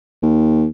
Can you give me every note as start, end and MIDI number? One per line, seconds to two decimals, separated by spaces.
0.22 0.65 39